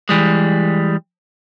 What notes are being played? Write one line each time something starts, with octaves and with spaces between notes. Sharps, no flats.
E3 G3 G#3